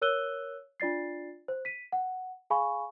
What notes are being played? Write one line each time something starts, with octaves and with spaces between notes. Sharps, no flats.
A#4 C#5 E6 F#6 D#7 G7
D4 F4 D5 A6 C7
C5
B6 D#7
F#5
G#4 F5 G#5 B5 C#6